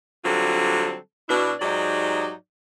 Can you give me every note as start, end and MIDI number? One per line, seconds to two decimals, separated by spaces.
0.24 0.95 50
0.24 0.95 54
0.24 0.95 55
0.24 0.95 60
0.24 0.95 65
0.24 0.95 69
1.29 1.52 47
1.29 1.52 62
1.29 1.52 64
1.60 2.31 44
1.60 2.31 54
1.60 2.31 63
1.60 2.31 67
1.60 2.31 74